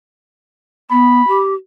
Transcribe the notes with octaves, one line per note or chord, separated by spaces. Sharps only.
B3 B5
G4